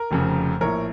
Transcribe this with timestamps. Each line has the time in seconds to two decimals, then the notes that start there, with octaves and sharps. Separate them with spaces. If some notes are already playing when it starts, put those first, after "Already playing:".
Already playing: A#4
0.11 F1 F2 C#3
0.61 A#1 A2 A#4 C#5